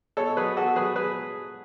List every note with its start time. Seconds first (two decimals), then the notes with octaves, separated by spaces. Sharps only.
0.17 B2 A4 C#5
0.37 F#3 G#4 B4
0.56 B2 F#4 A4
0.76 F#3 G#4 B4
0.95 F#3 G#4 B4